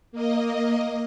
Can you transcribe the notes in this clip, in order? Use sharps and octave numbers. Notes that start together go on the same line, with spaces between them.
A#3 D#5